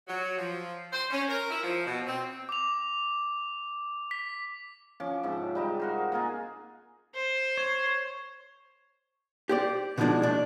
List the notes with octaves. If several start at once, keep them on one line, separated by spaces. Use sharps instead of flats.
F#3
F3
C5
C#4
A#4
E4
F3
B2
C4
D6 F7
B6
F3 C#4 D6
G#2 C3 F3
G3 D#4 G4
F#4 A#4 C5
A#3 D#4 F4 G#4
C5
C#5
G4 C5 D5
B2 D#3 F3 G#3 D4 E4
D#2 D4